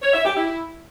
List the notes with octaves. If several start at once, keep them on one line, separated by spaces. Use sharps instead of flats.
C#5
E5
G4
E4